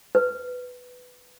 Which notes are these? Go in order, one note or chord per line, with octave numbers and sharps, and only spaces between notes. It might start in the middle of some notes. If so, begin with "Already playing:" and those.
B4